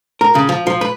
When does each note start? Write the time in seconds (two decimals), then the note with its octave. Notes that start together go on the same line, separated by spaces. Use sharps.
0.21 A#4
0.35 C#3
0.49 F3
0.67 F3
0.81 B4